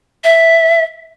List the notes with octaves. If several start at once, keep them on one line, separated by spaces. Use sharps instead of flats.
E5